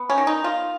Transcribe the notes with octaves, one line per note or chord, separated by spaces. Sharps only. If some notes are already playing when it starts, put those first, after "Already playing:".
Already playing: B3
C#4
D#3
D#4
D#3 F4